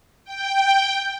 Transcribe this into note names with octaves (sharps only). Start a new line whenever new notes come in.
G5